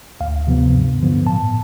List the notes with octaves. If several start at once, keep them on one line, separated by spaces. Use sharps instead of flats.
D2 F5
C3 F3 B3
G2
D3 F3 B3
A2 A5